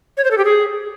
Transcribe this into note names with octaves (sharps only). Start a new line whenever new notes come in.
C#5
C5
A4
G4
G#4